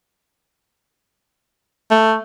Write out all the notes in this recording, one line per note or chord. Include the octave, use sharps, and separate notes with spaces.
A3